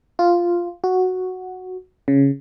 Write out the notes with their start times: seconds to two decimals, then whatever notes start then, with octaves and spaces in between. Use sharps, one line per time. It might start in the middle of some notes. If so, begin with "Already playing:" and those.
0.19 F4
0.84 F#4
2.08 C#3